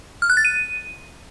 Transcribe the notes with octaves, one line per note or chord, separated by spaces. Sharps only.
F6
F#6
A6
D#7